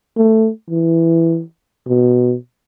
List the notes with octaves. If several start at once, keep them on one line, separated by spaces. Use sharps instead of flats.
A3
E3
B2